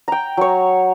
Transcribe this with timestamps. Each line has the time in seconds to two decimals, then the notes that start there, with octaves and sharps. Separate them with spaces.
0.08 G5 A#5
0.37 F#3 C#5